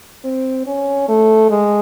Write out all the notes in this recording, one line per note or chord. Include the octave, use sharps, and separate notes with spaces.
C4
C#4
A3
G#3